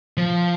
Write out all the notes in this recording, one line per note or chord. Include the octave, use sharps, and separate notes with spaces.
F3